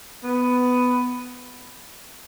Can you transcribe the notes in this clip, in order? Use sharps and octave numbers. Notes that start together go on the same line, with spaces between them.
B3